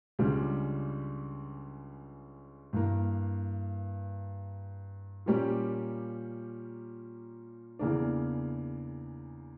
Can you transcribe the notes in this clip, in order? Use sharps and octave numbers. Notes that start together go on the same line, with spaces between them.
C#2 C#3 G3 D4
G2 E3 A#3
A#2 G3 A#3 C#4 G4
E2 C#3 E3 A#3 D4